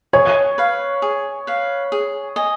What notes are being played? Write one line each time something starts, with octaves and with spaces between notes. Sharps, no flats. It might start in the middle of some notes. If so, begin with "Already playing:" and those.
G#4 C#5
B4 F5
G#4
B4 F5
G#4
D#5 G#5